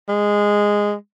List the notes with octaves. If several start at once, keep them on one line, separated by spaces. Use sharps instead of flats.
G#3